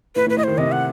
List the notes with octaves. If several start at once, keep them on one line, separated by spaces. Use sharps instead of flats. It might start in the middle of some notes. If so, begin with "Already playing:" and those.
A2 B4
A2
B4
A2 D#5
D#3 C5
C3 D#5
F#5